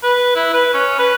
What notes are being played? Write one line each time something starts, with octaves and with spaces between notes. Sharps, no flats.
B4
E4
B4
C#4
B4